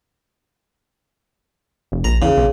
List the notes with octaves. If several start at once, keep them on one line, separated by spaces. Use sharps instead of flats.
F1
A#1 A#5
E2 C#3
B1